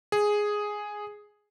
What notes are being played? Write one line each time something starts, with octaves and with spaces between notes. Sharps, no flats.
G#4